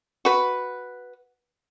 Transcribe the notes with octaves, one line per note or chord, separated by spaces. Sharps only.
F#4 B4